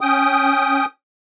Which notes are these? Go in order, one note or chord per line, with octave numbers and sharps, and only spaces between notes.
C#4 G5 D#6